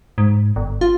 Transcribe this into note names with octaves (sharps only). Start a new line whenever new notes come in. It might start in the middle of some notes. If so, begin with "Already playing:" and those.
G#2
G1
F4